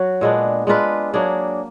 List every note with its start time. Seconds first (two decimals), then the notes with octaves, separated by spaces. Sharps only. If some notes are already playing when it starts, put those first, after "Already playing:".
Already playing: F#3 F#4
0.21 A#2 G#3 B3 D4
0.67 G#3 D4 F4 B4
1.13 F#3 A#3 D4 G#4